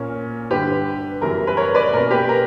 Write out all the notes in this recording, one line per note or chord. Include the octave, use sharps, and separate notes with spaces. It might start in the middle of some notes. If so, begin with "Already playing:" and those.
Already playing: A#2 A#3 C#4
G2 D3 G3 G4 B4
F#2 C#3 E3 G3 B3 A#4
B4
A#4 C#5
B4 D5
B2 A#3 C#4 A#4
G4 B4
A#4